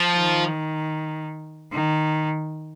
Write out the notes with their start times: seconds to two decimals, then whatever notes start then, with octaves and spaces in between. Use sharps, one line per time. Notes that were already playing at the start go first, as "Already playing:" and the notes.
Already playing: F3
0.15 D#3
1.72 D#3